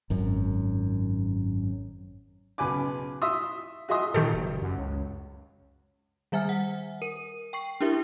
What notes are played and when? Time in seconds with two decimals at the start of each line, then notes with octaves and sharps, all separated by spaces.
0.10 G#1 F#2
2.58 B1 C#3 B4 G#5 D6
3.22 E5 C6 D#6 E6
3.89 F#4 G#4 D#5 E5 C6 D#6
4.14 A#2 D#3 G4 A4
4.34 F#1
4.62 F#2
4.77 C#2
6.32 D#3 G3 E5 G#5 F6
6.49 F#5
7.02 A#4 D#7
7.53 G5 C#6 C7
7.81 D4 E4 G4 A#4 E5